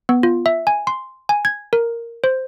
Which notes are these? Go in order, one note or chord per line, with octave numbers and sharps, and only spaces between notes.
B3
F4
E5
G#5
C6
G#5
G#6
A#4
C5